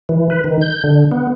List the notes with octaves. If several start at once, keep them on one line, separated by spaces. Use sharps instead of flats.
E3
B4
D#3
G6
D3
B3